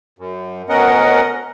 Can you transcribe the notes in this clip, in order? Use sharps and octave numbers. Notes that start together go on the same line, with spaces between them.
F#2
D2 B3 C#4 A#4 D#5 F#5